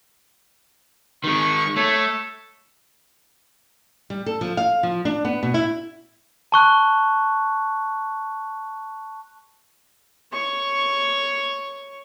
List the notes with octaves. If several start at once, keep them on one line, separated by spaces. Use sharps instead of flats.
D#3 G#3 C#6
A3 A4 C#5
G3
A4
F3
F5
F3
D4
B3
B2
E4
A5 C#6 F#6
C#5 C#6